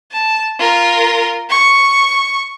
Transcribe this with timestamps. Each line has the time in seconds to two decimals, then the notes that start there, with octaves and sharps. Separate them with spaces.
0.12 A5
0.59 F4 A#4
1.50 C#6